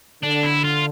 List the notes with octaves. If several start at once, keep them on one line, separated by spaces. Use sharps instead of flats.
D3 D4
E4
F4